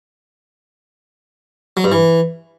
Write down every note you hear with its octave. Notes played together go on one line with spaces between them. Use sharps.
F#3
G2
E3